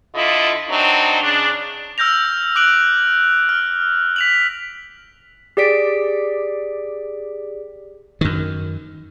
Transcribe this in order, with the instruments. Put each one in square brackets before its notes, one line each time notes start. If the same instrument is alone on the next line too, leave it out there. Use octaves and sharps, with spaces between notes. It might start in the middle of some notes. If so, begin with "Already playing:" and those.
[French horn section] D3 E4 F4 D#5
F#3 C4 D4 D#4
C#3 D4
[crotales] E6 F6 G6 A#6 F7
D6 F#6 D7 F#7
F6
B6 F7 F#7
[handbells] G4 G#4 D5 B6 D7
[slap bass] F#2 D#3